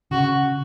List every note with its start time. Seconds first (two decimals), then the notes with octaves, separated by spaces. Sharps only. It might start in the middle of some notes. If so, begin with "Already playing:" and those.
0.11 C#3 F#4